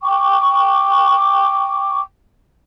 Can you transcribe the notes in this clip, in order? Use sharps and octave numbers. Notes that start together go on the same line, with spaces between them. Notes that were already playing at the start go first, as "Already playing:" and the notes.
G5 C#6 D6